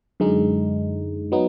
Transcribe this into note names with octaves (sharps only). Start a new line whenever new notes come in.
F#2 D3 G#3 D#4
F#3 B3 D#4